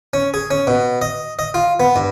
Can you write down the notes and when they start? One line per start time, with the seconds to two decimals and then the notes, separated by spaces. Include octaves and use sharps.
0.14 C#4
0.34 G#4
0.51 C#4
0.67 B2
1.02 D#5
1.39 D#5
1.54 F4
1.80 B3
1.96 G2